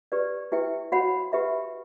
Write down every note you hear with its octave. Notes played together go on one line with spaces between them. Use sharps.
G4 B4 D5
E4 G4 B4 E5 G5
F#4 C#5 F#5 B5
G4 B4 E5 B5